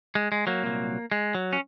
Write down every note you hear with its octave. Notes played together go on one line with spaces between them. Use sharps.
G#3
G#3
F#3 A#3
C2 A#2 F#3
G#3
F#3
C#4